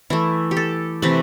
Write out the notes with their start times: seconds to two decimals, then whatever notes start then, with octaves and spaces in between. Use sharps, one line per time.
0.10 E3 A3 E4
0.51 G4
0.57 A4
1.02 C3 E3 A3 B4